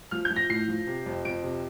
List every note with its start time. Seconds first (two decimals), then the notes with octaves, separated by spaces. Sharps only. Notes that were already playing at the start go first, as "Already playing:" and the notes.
0.11 F3 F6
0.25 G6
0.30 F3
0.36 A#6
0.49 A2 C7
0.68 F3
0.87 C3
1.06 F2
1.25 F2 D7
1.43 C3